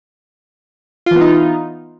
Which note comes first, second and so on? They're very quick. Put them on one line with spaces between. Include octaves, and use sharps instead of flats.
F4 E3 B3 D#4